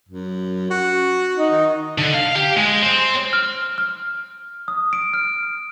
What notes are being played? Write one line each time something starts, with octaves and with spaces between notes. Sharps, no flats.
F#2
F#4
D#4
D#3
D3
F5
G4
G#3
C4
F6
F6
D#6
D7
F6